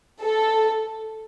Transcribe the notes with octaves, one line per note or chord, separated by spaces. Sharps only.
A4